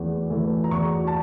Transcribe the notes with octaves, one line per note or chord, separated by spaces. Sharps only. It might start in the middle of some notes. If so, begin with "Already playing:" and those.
Already playing: E2 E3 A3
E3 A3
A#5
E2 C#6
A5